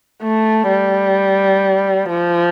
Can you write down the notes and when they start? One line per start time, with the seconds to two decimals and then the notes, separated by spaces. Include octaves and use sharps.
0.22 A3
0.69 G3
2.09 F3